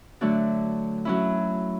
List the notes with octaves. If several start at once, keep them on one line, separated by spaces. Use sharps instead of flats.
D3 F#3 A3 D4 F#4
F#3 C#4 E4